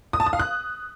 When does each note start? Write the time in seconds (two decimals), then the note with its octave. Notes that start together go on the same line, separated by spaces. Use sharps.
0.13 D#6
0.20 A5
0.26 D#6
0.33 F5
0.39 F#6